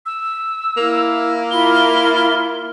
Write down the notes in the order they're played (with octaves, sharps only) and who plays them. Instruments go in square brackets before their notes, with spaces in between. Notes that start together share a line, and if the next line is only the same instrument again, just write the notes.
[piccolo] E6
[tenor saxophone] A#3 [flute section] E4
[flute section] E4 F4 B5 [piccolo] G7